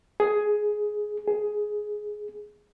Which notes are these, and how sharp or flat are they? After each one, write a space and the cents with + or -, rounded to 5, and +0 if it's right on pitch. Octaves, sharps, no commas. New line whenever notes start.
G#4 +10
G#4 +10